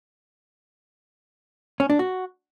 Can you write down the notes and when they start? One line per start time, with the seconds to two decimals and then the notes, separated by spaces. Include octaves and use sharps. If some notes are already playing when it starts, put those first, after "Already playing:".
1.80 C#4
1.90 D4
1.99 F#4